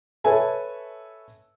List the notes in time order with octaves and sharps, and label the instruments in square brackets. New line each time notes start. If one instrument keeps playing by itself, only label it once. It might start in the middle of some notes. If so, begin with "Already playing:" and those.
[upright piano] A4 B4 C#5 E5 G#5 A5